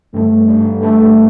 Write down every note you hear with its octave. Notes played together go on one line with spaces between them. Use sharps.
G2 D3 G3 A3 D4
G2 D3 G3 D4
G2 D3 G3 A3 D4